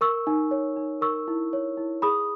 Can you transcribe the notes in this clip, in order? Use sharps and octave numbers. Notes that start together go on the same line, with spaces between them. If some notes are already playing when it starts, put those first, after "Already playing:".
A#4 C#6 E6
D#4
C#5
D#4
A#4 C#6 E6
E4
C#5
E4
G#4 B5 D#6